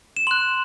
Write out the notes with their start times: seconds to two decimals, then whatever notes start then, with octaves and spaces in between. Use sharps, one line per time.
0.17 E7
0.27 C6 F#6 F#7